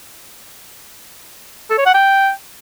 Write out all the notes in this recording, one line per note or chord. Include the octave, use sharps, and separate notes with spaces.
A4
C#5
F#5
G5